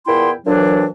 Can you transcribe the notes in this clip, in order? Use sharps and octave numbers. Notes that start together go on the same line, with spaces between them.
E2 A#2 B3 E4 G5 C6
D2 A#2 E3 F#3 D4